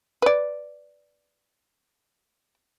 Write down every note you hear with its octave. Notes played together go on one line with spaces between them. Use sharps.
B4 D5